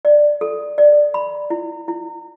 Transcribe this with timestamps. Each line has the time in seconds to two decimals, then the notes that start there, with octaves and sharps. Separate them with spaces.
0.05 D5
0.41 A4
0.78 D5
1.14 B5
1.50 E4
1.88 E4